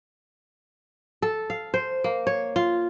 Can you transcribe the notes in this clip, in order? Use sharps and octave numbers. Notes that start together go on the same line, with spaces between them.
A4
F5
C5
A#3
C#5
F4